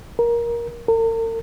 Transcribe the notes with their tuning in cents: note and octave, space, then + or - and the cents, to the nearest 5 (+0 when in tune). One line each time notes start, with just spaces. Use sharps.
A#4 +15
A#4 -45